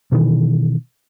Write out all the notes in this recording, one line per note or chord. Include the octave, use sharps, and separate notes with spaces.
B2 D#3 E3